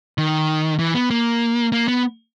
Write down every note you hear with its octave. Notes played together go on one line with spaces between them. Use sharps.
D#3
E3
B3
A#3
A#3
B3